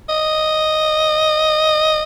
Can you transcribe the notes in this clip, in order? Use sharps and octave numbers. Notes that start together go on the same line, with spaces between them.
D#5